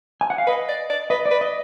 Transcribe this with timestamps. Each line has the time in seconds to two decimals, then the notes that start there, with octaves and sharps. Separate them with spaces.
0.21 G#5
0.30 F#5
0.38 F5
0.47 B4 D#5
0.69 D5
0.90 D5
1.10 B4 D#5
1.26 D5
1.31 B4
1.41 D#5